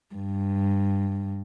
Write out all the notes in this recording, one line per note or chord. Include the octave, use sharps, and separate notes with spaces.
G2